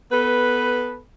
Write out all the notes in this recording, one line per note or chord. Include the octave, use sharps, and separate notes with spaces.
B3 A4 B4